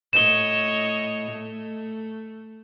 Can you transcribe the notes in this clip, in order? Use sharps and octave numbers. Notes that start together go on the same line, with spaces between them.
A2 C#5 D#5 E7 G7
A3